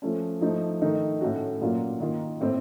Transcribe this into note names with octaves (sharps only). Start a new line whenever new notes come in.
F3 A3 C#4
F3 A3 D#4
D#3 A3 D#4
A2 A3 C#4 F#4
A#2 F#3 A#3 C#4 F4
D#3 A#3 F4
A2 A3 C4